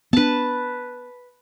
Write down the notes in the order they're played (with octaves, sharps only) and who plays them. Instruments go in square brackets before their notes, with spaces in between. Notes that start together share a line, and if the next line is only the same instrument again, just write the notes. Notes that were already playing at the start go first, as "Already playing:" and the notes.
[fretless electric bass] B3 D4 [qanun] B4 A5